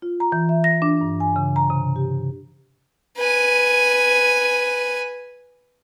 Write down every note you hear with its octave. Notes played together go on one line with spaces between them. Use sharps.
F4
A#5
E3
E5
A#6
D4
G2
G#5
C#3
A#5
C3
G4
B4 G#5